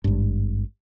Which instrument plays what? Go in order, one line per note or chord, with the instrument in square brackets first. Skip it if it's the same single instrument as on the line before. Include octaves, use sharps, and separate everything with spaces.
[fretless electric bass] G#1 G2